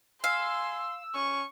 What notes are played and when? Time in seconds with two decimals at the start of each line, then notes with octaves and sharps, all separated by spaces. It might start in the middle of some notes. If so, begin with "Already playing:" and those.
0.24 F5 G#5 C6 E6
1.15 C#4 C#6